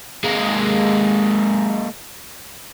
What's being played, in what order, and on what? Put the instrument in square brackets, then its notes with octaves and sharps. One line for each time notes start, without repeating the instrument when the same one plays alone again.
[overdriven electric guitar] G#3 A#3